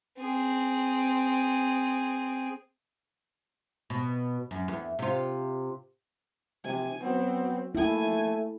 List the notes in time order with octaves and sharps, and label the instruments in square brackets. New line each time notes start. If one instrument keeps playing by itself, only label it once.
[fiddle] C4 G#4
[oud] B2
F#2
E2
C3 F4
[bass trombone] C3 [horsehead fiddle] G#5
[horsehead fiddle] F#3 C4 [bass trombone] B3
[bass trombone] A3 [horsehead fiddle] A#3 G#5 [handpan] E4